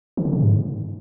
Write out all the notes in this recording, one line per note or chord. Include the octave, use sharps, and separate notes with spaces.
D#3
C#3
C3
G#2